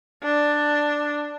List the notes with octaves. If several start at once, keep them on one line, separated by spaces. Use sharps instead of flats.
D4